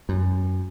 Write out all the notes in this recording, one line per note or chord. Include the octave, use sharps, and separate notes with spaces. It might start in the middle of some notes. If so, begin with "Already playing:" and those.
F#2